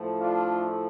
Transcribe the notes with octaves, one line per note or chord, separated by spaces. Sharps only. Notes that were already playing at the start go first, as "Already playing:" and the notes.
Already playing: A2 F3 A3
D4 F4